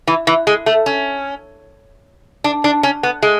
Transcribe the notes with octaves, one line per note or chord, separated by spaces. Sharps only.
E3
E3
G#3
A3
C#4
D4
D4
C#4
B3
G#3